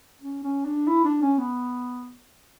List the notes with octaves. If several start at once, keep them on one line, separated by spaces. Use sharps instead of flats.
C#4
C#4
D4
E4
D4
C#4
B3